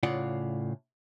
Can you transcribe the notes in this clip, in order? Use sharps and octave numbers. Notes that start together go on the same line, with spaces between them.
A2 C#3 F4 D5 F#5